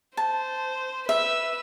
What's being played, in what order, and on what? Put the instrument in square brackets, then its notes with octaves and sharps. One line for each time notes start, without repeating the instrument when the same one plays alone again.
[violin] C5 [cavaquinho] A5
[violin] B4 E6 [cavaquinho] E5